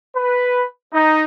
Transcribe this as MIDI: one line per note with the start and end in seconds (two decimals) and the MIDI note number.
0.16 0.63 71
0.93 1.24 63